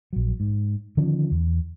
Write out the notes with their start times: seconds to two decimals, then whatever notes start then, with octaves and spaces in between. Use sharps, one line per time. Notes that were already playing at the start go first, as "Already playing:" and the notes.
0.13 A#1 F#3
0.40 G#2
0.97 D3 D#3 F3 C#4
1.32 E2